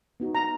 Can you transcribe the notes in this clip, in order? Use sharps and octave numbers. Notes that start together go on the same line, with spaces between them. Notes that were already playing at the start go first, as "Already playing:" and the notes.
B3 D#4 F#4
A#5